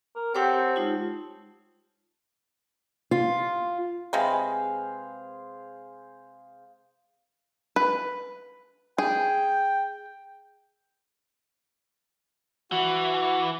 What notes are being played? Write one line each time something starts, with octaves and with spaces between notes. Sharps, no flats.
A#4
C4 G4 A4 C5 C#5 F#5 G5
G#3 D#4 F4
F4
C3 G#3 G#4 B4 C5 F5
B4
G#4 G5
E3 F#4